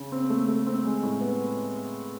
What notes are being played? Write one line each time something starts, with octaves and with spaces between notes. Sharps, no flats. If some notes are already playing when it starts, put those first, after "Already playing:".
Already playing: C#3
C4
A3
A3
C4
G#3
A2
B3